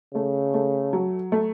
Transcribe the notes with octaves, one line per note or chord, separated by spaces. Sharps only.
C#3 A3
A3
F#3
A3